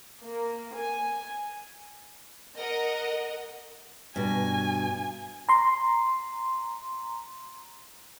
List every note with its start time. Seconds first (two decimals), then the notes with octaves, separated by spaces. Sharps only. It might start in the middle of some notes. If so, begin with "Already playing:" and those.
0.21 A#3
0.74 G#5
2.57 A#4 D#5 F#5
4.16 G2 B2 G#5
5.49 A#5 C6